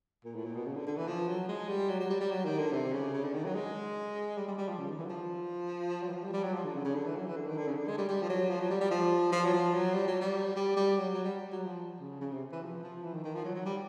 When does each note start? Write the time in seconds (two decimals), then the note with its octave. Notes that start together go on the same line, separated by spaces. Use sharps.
0.25 A#2
0.35 A2
0.45 A#2
0.55 B2
0.66 C#3
0.76 D3
0.87 D3
0.97 E3
1.07 F3
1.28 F#3
1.48 G#3
1.69 G3
1.89 F#3
2.00 F#3
2.10 G3
2.20 G3
2.31 F#3
2.45 D#3
2.58 D3
2.72 C3
2.93 C#3
3.14 C#3
3.24 D3
3.34 D#3
3.44 F#3
3.54 G#3
4.37 G3
4.48 G3
4.58 G3
4.68 F3
4.79 C#3
4.88 D#3
4.99 E3
5.05 F#3
5.09 F3
6.02 F#3
6.08 E3
6.12 F3
6.22 G3
6.33 G3
6.43 F#3
6.53 F3
6.64 D3
6.75 C#3
6.85 C#3
6.95 D3
7.06 E3
7.16 F#3
7.26 E3
7.36 D3
7.47 D#3
7.57 D3
7.67 C#3
7.77 D3
7.88 G#3
7.98 G3
8.09 G3
8.22 F3
8.29 F#3
8.50 F3
8.60 F#3
8.70 G3
8.81 G3
8.91 F3
9.32 F3
9.45 F#3
9.53 F3
9.74 F#3
9.94 G3
10.08 F#3
10.21 G3
10.56 G3
10.77 G3
10.97 F#3
11.14 F#3
11.24 G3
11.52 F#3
11.66 F3
12.00 C#3
12.21 C#3
12.32 C3
12.52 E3
12.62 F3
12.83 F3
13.03 E3
13.13 D#3
13.24 D#3
13.35 F3
13.45 F#3
13.55 F#3
13.66 G3